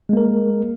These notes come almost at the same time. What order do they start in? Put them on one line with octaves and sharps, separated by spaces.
G#3 A#3 A#4